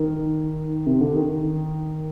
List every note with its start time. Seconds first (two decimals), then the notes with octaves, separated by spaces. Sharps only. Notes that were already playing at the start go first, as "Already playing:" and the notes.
Already playing: D#3
0.86 C3
1.01 D3
1.15 D#3
1.28 D#3
1.42 D#3